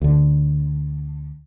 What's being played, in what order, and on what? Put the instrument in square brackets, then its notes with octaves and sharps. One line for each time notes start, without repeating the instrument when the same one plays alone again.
[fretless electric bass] D2 D3